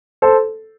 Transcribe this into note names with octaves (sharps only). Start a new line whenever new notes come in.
A4 C5